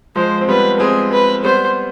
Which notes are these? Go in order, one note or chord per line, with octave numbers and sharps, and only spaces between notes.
F3 G#3 C5
C4
G3 B3 B4
G#3 C4 G#4
B4
G3 B3 C5